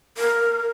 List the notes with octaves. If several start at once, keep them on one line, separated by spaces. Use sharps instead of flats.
A#4